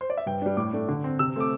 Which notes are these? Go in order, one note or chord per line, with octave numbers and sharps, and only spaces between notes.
C5
D5
E5
G2 G5
G3 D4
A2 D6
A3 D4
D3
C4
C3 E6
A3 C4 D6